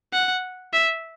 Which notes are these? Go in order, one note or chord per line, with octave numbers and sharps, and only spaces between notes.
F#5
E5